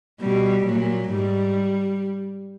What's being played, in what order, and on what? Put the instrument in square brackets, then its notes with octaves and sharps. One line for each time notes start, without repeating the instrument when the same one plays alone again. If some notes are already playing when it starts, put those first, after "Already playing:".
[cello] B2 [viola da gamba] G3
[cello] A#2 [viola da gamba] F#3
[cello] G#2 [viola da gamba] G3